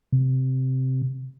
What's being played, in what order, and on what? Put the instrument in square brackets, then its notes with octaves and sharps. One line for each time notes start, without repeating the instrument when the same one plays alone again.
[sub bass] C3